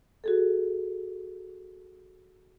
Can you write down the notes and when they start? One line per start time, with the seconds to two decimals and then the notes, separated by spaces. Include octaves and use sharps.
0.24 F#4 G#4 A4